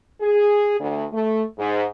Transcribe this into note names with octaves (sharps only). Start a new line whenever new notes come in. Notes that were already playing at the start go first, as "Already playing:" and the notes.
G#4
D2
A3
G#2